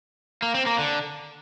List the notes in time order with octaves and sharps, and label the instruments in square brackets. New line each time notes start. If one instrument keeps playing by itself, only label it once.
[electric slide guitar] A#3
C4
A#3
D3